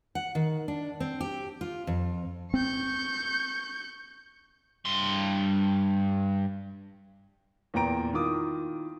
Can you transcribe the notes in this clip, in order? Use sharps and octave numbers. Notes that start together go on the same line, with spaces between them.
F#5
D#3
D4
C4
G4
F4
F2
C4 C#6 G6
G2 C6
E2 A#2 G5 A#5 D7
D#3 E4 F4 D6 D#6